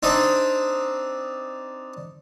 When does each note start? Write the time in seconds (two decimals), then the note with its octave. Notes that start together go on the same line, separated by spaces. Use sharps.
0.03 C4 D4 D#4